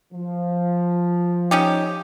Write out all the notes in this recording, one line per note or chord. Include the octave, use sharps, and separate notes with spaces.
F3
C#4 D#4 G4